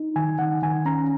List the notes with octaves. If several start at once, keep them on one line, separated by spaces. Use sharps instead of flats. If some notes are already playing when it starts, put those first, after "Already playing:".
Already playing: D#4
D#3 G#5
D#3 F#5
D#3 G#5
C#4 A#5